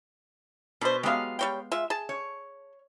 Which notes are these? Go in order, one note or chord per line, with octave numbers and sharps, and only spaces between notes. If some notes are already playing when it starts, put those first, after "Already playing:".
B2 D4 B4 C5
F#3 G#3 B3 G4 F5
G3 C#5 G5
G#3 F4 E5
G#4 A5
C#5